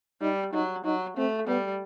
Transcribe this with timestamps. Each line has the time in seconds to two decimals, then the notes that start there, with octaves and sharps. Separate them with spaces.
0.21 G3 D#4
0.53 F#3 D#4
0.85 F#3 D#4
1.17 A3 C4
1.48 G3 B3